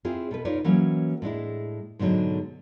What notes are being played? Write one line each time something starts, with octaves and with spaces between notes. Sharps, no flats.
C4 E4 F4 G#4
B2 A4 B4
D#4 F4 B4 C#5 D5
E3 F#3 A#3 C#4
A2 G#3 D4 E4
G#2 B2 D3 F#3 G#3